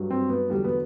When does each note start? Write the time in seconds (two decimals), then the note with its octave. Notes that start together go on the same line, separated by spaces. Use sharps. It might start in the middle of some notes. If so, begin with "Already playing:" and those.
Already playing: G2 F#3
0.11 C4
0.29 B3
0.50 E2 D3 F#3 G3
0.64 B3